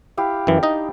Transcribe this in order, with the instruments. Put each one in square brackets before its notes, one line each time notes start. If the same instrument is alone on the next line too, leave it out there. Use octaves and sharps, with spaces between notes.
[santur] E4 G4 F5
[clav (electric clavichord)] F#2 E3 [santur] D4
[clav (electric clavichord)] D#4 D#5